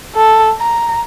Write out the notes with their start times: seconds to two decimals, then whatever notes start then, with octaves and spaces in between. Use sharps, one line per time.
0.15 A4
0.60 A#5